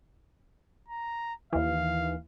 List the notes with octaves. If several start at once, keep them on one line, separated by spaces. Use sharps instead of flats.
A#5
D#2 E3 F5